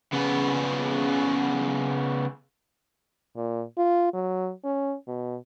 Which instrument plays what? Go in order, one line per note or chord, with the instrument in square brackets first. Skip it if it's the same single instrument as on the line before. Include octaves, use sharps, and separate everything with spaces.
[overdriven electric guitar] C#3 B3
[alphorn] A#2
F4
F#3
C#4
B2